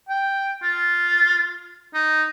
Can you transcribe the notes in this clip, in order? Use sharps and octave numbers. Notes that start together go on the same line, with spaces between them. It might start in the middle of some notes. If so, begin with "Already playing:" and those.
G5
F4
D#4